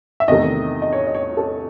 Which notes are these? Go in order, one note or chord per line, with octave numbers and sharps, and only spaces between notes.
E5
E2 C3 D#3 A3 D#5
D#5
C#5
D#5
C#5
A4